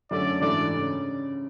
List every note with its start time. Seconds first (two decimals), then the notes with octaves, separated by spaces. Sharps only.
0.11 F#2 D3 A3 C#4 D5
0.41 G#2 E3 A3 D4 D5
0.74 C#3